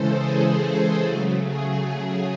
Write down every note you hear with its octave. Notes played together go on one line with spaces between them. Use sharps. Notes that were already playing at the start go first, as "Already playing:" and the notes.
Already playing: C#3 E3 G#3 A4 C5
G#4
C#3 F#3 A3
G#4
G#4